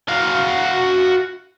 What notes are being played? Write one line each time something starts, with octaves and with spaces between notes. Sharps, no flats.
F#4 F5